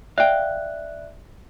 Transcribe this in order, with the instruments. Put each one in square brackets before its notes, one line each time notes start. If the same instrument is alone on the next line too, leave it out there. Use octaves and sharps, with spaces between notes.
[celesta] D5 E5 F#6 [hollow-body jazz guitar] F5 G5